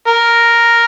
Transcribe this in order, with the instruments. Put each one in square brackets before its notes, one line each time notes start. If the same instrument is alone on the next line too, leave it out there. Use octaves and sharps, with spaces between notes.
[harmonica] A#4